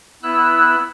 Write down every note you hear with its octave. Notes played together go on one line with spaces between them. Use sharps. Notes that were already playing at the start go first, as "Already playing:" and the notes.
B3 E4 E6 F#6